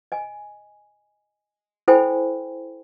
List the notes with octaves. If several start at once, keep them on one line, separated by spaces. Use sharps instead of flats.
D#5 G#5
E4 A4 C5 G5 G#5 B5